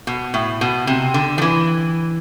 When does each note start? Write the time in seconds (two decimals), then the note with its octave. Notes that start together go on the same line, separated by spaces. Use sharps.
0.07 B2
0.34 A2
0.61 B2
0.87 C3
1.14 D3
1.38 F3
1.42 E3